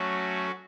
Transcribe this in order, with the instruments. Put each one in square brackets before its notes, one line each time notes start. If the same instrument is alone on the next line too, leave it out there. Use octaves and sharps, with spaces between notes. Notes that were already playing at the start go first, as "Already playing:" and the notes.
Already playing: [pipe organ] F#3 A3 C#4 F#4